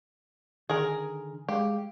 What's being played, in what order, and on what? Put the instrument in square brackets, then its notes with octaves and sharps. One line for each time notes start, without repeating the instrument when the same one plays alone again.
[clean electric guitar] D3 D#3 [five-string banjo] G#4 A#4
[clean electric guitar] G#3 G#4 F5 [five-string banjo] G4